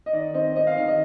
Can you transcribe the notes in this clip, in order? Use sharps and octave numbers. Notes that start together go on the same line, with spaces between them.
D#5
D#3 D5
C4 D#5
C4 D#5
F5
D#3 F5
D#5